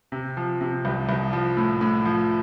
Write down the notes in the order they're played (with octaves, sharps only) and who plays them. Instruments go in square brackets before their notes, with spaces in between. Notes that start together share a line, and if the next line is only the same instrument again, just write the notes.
[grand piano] C3
F3
C3
C2
C2
F3
A2
A2
F3